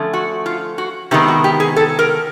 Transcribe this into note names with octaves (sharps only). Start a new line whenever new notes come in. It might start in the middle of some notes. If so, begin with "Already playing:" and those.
Already playing: D3 F3 A3 C#4
F#4
F4
F#4
C3 D#3 G#3 B3 G4
F#4
G4
G#4
A4
A#4